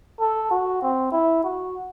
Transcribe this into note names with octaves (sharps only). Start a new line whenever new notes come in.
A4
F#4
C4
E4
F#4